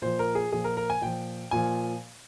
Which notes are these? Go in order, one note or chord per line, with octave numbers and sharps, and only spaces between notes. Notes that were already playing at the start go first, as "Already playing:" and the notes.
A#2 F3 C5
A#4
G#4
A#2 F3 G#4
A#4
A#4
G#5
A#2 F3 G5
A#2 F3 G#5